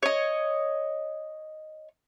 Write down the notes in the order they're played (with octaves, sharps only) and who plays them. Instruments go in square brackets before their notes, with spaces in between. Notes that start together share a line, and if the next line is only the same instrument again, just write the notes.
[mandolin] C#5 D#5